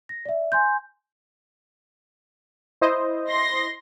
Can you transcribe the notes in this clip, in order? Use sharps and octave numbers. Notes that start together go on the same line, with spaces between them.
A#6
D5 E5
G#5 C6 G6
E4 C5 D#5
C6 A#6